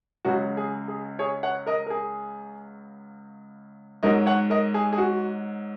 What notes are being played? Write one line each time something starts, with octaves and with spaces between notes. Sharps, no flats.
C#2 C#3 F#3 F#4
G#4
G#4
G#4 C#5
C#5 F#5
A#4 D#5
A#4
G#4
G#2 F#3 A#4 D#5
C#5 F#5
A#4 D#5
G#4
G#4
F#4